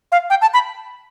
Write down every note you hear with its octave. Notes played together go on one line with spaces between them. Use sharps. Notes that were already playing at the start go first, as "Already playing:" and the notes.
F5
G5
A5
B5